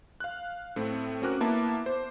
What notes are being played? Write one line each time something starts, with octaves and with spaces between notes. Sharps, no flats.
F5 F#6
A2 A3 C4
C4 C#4 F#4 A#4 D6 F#6
A#3 B3 E4 E5 A5 D6
C5